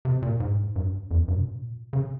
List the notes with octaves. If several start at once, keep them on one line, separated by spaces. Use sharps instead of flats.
C3
A#2
G#2
G2
F2
G2
C3
A#2
C#3